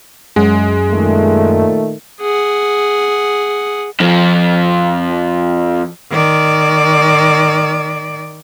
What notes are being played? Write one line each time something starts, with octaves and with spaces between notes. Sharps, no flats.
F#2 G#3
A#2 D#3 A3
G#4 F#5
F2 F3
D#3 D5